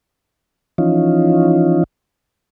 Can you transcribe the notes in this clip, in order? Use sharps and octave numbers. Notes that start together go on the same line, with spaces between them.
E3 F3 C#4 D#4 F4